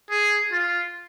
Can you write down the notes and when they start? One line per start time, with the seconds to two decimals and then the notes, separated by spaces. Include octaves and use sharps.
0.11 G#4
0.52 F4